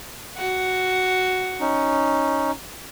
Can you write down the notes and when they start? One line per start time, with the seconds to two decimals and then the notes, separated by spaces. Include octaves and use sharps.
0.36 F#4
1.60 C#4 D#4